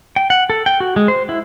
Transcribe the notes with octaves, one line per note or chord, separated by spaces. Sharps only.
G5
F#5
A4
G5
F#4
G#3
C5
E4